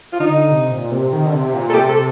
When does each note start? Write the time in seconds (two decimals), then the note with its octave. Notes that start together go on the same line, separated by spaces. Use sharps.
0.13 F4
0.20 D3 D#4
0.51 C3
0.71 A#2
0.91 C3
1.13 D#3
1.26 D3
1.33 C3
1.54 A#2
1.70 A4
1.73 C3 G4
1.89 A4